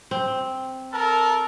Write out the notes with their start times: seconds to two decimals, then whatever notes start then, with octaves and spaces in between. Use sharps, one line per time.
0.11 C4
0.92 A4 A#4 A5